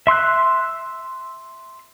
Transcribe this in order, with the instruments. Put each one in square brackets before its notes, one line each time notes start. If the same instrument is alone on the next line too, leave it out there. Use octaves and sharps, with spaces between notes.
[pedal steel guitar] E5 C6 E6 F#6